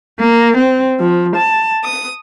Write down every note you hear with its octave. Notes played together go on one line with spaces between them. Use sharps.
A#3
C4
F3
A5
D#6